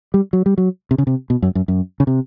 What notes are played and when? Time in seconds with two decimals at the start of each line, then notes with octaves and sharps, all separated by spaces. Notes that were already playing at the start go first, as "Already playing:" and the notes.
0.14 G3
0.33 F#3
0.46 G3
0.58 F#3
0.91 C3
0.98 C#3
1.07 C3
1.30 B2
1.42 F#2
1.55 F#2
1.68 F#2
2.00 C#3
2.07 C3